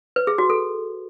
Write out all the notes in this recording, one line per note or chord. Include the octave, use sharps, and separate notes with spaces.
B4
G#4
F#4
A4